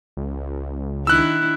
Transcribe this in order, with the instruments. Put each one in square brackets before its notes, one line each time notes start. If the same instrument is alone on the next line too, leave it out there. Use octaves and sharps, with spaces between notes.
[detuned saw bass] C#2
[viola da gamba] D#3 D4 E4 [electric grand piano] E6 F#6